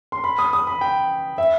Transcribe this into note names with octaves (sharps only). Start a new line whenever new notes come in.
C6
B5
D#6
D#6
B5
G5
E5